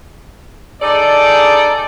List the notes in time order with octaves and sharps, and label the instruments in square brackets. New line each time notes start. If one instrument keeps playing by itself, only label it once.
[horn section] D#4 G#4 A4 D5